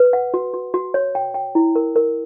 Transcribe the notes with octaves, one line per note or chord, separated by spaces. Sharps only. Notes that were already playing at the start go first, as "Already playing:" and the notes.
Already playing: B4
F#5
F#4
F#4
F#4
C#5
G5
G5
E4
A#4
A#4